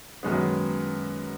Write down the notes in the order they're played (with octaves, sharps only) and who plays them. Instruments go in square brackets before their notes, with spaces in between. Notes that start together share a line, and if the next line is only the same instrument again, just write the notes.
[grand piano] F#2 D#3 G#3 B3